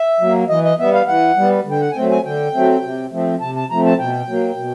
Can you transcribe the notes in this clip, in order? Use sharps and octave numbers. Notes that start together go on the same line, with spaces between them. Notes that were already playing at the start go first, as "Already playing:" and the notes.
Already playing: E5
F#3 A#3
E3 D#5
D#5
G3 B3 E5
F5
E3 F#5
G3 B3
D3
G5
F#5
G#5
F#3 A3 C4 G5
G#5
D3 G5
F#3 A3 C4
C3
F3 A3 C4
C3 A5
A5
F3 A3 C4 A#5
A5
B2 G5
F#3 A#3
B2